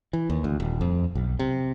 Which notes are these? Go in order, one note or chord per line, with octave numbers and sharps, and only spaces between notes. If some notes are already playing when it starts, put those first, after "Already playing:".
E3
D#2
D2
D#1
F2
B1
C3